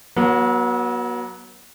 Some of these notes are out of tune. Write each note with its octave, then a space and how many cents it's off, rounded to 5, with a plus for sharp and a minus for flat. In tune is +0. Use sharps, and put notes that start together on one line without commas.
F#3 +0 B3 -40